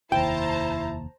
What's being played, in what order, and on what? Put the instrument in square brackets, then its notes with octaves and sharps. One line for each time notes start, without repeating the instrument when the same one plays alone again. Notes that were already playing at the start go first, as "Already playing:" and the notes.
[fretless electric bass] F1 D#2 [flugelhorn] E4 [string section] C5 A5 A#5 [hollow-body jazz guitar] G5